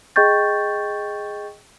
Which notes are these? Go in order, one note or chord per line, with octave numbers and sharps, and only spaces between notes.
G#4 D#5 G5 C#6 G6 A6